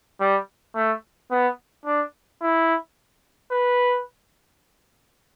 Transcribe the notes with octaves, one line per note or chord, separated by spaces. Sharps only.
G3
A3
B3
D4
E4
B4